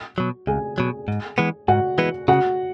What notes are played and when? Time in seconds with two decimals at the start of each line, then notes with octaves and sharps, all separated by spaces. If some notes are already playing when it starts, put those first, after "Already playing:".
Already playing: F#4
0.18 B2 F#3
0.47 C#2 G#4 G#5
0.78 B2 F#3
1.08 G#2
1.38 E3 G#3 B3
1.68 G#2 F#4 F#5
1.98 E3 G#3 B3
2.28 C#3 F#4 F#5